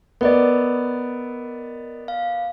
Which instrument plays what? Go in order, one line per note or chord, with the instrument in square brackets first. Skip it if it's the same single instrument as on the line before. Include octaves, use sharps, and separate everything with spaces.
[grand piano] B3 D5 [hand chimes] A#4 D#5
[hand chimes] F5